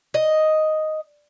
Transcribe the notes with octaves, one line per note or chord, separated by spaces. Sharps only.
D#5